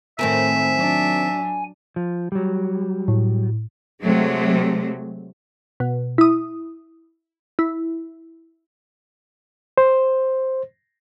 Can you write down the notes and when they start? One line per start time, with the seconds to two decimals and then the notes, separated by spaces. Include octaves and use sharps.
0.19 A2 D#3 A3 C4 A#4 E5 G#5
0.75 F#3 D4
1.96 F3
2.32 F#3 G3
3.08 A2
4.03 C3 F#3 G#3 A3
5.80 B2
6.18 E4 D#6
7.59 E4
9.78 C5